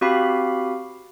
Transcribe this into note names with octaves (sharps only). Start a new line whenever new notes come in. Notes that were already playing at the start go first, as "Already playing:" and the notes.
C4 F#4 G4 F5 B5